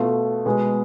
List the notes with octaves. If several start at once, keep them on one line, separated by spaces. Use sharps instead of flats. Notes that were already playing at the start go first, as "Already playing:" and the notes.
Already playing: B2 A3 F4 A4
B2 G#3 B3